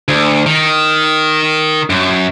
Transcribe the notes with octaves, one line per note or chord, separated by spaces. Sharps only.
D2
D#3
F#2